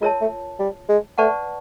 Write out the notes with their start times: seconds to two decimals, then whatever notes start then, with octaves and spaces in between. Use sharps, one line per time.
0.01 G#3 F4 A#4 C#5 E5 A5
0.21 A3
0.59 G3
0.89 G#3
1.18 A3 B4 D5 F#5 A5 C#6